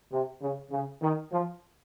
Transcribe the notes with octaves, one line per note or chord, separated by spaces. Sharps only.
C3
C#3
C#3
D#3
F3